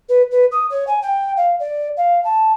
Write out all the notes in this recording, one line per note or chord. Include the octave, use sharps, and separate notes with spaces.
B4
B4
D#6
C#5
G#5
G5
F5
D5
F5
A5